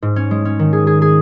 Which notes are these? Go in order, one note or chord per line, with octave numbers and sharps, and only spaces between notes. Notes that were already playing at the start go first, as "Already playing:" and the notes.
G#2
C#4
G#3
C#4
D#3
G#4
G#4
G#4